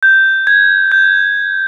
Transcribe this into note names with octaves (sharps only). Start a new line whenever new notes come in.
G6
G#6
G6